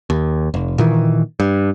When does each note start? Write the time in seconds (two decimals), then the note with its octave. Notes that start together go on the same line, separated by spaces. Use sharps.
0.10 D#2
0.54 F1
0.78 A#2 D#3 E3
1.40 G2